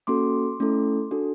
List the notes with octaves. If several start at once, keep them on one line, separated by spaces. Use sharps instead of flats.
A#3 C#4 F#4 A4 C6 D6
A3 C#4 E4 A4
D4 F#4 A4